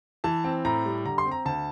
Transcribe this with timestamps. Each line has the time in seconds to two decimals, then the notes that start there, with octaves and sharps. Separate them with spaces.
0.24 E3 A5
0.44 C4
0.65 A2 A#5
0.85 G3
1.05 D3 A#5
1.18 C6
1.25 C4
1.31 A#5
1.45 D2 A5